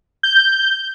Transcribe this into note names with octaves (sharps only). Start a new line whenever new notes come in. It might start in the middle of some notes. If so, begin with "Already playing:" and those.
G6